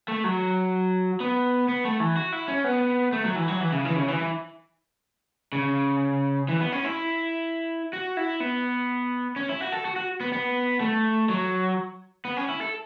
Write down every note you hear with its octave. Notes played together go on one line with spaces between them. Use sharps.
A3
F#3
B3
B3
A3
E3
F#4
E4
C#4
B3
A3
F#3
E3
F#3
E3
C#3
E3
C#3
E3
C#3
E3
B3
C#4
E4
F#4
E4
B3
C#4
E4
F#4
A4
F#4
F#4
B3
B3
A3
F#3
B3
C#4
E4
A4